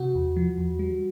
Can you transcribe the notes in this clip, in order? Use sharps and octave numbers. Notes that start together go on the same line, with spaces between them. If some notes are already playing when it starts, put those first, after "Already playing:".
Already playing: C3 F#4
E2
F3
E2
G3